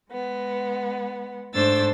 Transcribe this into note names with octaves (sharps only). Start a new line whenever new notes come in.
G#3 B3
G#2 A3 D4 C5 E6 A6